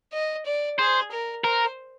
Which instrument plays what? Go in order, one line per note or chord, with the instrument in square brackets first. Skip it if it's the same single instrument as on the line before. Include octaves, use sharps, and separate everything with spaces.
[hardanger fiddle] D#5
D5
[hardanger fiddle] G#4 [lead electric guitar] C5
[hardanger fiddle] A#4
[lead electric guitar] A#4 [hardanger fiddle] C5